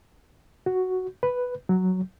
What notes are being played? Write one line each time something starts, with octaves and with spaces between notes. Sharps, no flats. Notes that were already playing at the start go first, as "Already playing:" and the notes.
F#4
B4
F#3